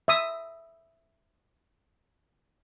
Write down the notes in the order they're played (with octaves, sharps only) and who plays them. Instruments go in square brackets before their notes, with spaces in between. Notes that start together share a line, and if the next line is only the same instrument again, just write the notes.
[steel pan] E5 D#6